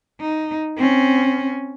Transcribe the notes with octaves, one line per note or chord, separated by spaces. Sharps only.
D#4
C4 C#4